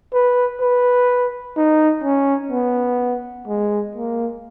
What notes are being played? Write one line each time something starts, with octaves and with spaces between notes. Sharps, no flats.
B4
B4
D#4
C#4
B3
G#3
A#3